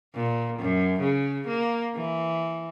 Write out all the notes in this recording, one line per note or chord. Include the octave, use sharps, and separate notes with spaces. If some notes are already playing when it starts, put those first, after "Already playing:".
A#2
F#2
C#3
A#3
E3